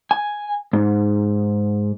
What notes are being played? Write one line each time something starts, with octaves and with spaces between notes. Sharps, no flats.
G#5
G#2